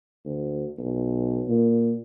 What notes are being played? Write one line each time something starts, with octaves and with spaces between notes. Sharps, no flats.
D2
B1
A#2